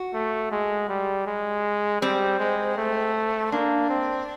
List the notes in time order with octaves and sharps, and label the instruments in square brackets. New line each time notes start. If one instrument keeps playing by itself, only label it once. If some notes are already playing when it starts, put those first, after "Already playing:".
Already playing: [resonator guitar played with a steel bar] F#4
[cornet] A3
G#3
G3
G#3
[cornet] G3 [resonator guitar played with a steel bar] C4
[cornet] G#3
A3
[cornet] A#3 [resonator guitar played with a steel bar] D4
[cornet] C4